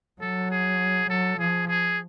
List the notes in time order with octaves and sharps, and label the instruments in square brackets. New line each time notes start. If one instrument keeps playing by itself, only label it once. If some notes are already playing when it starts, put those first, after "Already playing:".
[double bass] F#3 [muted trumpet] A4
[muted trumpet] G#4
[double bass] F#3 [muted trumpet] A4
[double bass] F3 [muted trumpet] G#4
[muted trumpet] G#4